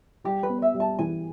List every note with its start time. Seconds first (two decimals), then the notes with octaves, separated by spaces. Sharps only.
0.24 G3 G4
0.43 B4
0.49 B3
0.62 E5
0.74 G3
0.80 A5
0.99 E3 G#5